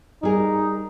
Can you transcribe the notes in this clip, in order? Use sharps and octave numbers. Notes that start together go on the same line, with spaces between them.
G3 D#4 G#4 A#4